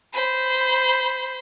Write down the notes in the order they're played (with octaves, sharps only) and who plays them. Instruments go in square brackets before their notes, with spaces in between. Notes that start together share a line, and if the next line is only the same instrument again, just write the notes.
[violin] C5 B5